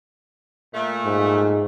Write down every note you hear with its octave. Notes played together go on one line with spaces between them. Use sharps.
A#2 A3
G#2